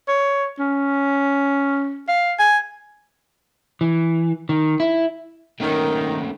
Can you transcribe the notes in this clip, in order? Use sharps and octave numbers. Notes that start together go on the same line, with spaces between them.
C#5
C#4
F5
G#5
E3
D#3
E4
D#3 A3 A#3 C#4